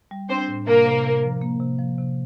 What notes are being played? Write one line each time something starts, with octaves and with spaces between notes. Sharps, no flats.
G3
C4 D4 C5
A2
C3 A#3 A#4
C3
C3
F3
A#3
C3
F3
C3